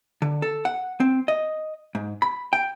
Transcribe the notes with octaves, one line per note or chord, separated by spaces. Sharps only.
D3
A4
F#5
C4
D#5
G#2
B5
G5